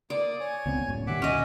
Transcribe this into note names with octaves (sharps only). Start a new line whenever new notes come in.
A#3 D5 D#6
C#5 G#5
C#2 B3 C4
F#2 A2
A#2 D#3 G3 E5 F#5 D6
D2 A#2 C#4 D#5